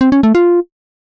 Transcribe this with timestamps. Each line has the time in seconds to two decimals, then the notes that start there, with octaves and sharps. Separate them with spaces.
0.01 C4
0.12 C#4
0.23 A3
0.35 F4